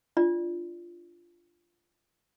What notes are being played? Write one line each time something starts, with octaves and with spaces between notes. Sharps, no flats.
D4 F4 D5